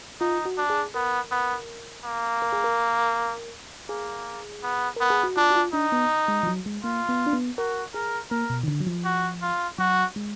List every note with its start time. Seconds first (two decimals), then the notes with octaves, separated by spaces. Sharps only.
0.21 D#4 F4
0.46 F#4
0.57 D4
0.70 G#4
0.94 B3 A#4
1.31 B3
2.05 A#3
2.42 A#4
2.53 G#4
2.64 A#4
3.89 A#3 G#4
4.63 B3
4.96 B3 A#4
5.10 G#4
5.23 F#4
5.37 D4 F4
5.50 F#4
5.56 F4
5.73 D4 D#4
5.92 B3
6.28 G#3
6.43 F3
6.47 F#3
6.66 G#3
6.84 A#3 F4
7.09 B3
7.26 D4
7.33 B3
7.58 F#4 A#4
7.94 G#4 A#4
8.31 A#3 A#4
8.50 B2
8.63 D#3
8.68 D3
8.80 F#3
8.87 F3
9.05 F#4
9.42 F4
9.78 F#3 F#4
10.16 G#3